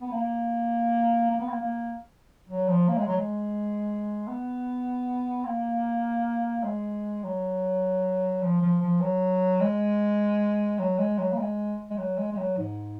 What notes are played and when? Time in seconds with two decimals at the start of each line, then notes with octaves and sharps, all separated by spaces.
0.02 B3
0.12 A#3
1.31 A#3
1.41 B3
1.49 A#3
1.61 A#3
2.49 F#3
2.69 F3
2.89 A#3
2.98 G#3
3.07 F#3
3.17 G#3
4.28 B3
5.45 A#3
6.64 G#3
7.24 F#3
8.43 F3
8.62 F3
8.82 F3
9.01 F#3
9.61 G#3
10.79 F#3
10.99 G#3
11.18 F#3
11.33 A#3
11.39 G#3
11.90 G#3
11.98 F#3
12.18 G#3
12.32 G#3
12.37 F#3
12.58 G#2